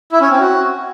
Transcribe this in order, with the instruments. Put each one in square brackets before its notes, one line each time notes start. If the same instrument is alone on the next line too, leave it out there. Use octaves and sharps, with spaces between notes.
[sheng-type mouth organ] E4
C#4
C4
F#4